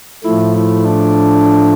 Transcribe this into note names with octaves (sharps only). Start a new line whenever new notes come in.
A2 F3 A3 E4
E4
D4